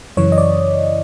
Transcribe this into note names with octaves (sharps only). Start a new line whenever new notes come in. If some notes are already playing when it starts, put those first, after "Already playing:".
F#2 C#3 E3 C#5
D#5
D5